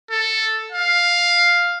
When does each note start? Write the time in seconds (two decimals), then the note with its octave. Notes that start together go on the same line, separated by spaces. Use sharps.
0.11 A4
0.72 F5